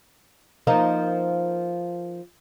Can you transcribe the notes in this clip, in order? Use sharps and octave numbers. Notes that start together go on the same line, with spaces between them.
F3 A#3 D#4